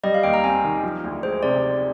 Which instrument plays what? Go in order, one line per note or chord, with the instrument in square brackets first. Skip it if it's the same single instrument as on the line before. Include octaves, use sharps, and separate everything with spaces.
[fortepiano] G3 [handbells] D#5
[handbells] F5
[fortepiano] D#2 [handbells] G5
[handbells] A#5
[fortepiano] C4 [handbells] G#5
[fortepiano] D#3
F3
D2
[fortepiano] G#3 [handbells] C5
[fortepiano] C3 [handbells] D5